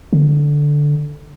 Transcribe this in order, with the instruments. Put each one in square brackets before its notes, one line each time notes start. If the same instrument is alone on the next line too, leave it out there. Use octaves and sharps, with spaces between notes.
[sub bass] D3